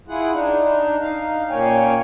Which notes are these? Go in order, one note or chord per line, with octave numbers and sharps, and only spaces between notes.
E4 F4 G#4 F#5
D4 D#4
D#4 F5
A#2 A#3 C#4 C#5 G5 G#5